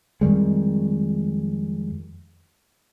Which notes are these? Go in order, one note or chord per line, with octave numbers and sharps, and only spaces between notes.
F2 D#3 G3 G#3